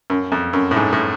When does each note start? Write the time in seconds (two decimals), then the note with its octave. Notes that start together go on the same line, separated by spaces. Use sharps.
0.10 F#2
0.32 F2
0.53 F#2
0.71 A2
0.76 G#2
0.93 A2